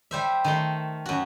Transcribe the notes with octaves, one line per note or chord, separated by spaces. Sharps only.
G3 C5 E5
D#3 A3 C6
F#2 F#4